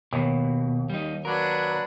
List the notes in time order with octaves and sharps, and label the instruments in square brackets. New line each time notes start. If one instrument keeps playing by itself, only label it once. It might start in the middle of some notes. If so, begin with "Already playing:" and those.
[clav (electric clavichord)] D#2 [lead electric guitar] B2
[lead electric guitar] G3 D#4
[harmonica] F#3 D4 B4 [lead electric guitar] A#4